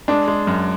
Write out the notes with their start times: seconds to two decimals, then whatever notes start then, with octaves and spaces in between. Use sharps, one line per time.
0.08 G#3 D4
0.28 G#3
0.47 F#2